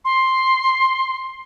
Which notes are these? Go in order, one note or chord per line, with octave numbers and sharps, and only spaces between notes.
C6